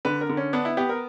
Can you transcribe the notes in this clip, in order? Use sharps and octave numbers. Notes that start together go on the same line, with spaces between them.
D3 B4
A#4
D3
C#4
B3 D4
E4
B3 G4
A#4